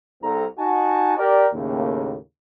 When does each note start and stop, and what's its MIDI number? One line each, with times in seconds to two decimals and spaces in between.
0.22 0.44 36
0.22 0.44 60
0.22 0.44 69
0.22 0.44 82
0.59 1.16 63
0.59 1.16 66
0.59 1.16 80
0.59 1.16 81
1.18 1.48 67
1.18 1.48 70
1.18 1.48 74
1.54 2.15 39
1.54 2.15 45
1.54 2.15 49
1.54 2.15 58